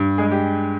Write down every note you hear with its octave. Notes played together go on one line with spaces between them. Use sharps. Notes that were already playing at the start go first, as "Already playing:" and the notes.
Already playing: G2
G#3 G#4
G4